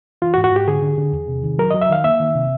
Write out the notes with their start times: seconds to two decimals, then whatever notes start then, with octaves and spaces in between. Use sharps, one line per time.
0.22 E3 F4
0.34 F#4
0.37 G#2
0.44 F#4
0.52 G#2 G4
0.67 D3 G#4
0.82 D3
0.98 D3
1.12 E2
1.28 C3
1.43 D#3
1.59 F#3 A#4
1.71 F#3 D#5
1.82 E5
1.89 D#3 F5
2.04 A#3 E5
2.20 D#3
2.35 C3